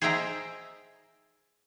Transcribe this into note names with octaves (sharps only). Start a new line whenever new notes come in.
G#4 C5 D#5 E5 G5 A#5